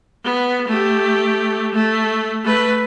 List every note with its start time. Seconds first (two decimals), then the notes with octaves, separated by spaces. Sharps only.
0.24 B3
0.68 A3 G4
1.74 A3
2.44 A3 B4